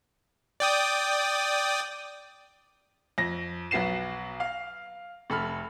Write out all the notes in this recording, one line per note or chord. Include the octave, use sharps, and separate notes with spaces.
D5 G5 D#6
F2 A#6
B1 F#3 B3 C7 E7
F5
F1 A4 B5 F6